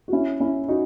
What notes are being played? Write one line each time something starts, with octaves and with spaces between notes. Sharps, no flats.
F#4
C#4 E4
C#4 E4
D#4 F#4